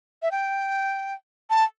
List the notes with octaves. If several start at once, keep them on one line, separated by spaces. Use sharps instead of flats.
E5
G5
A5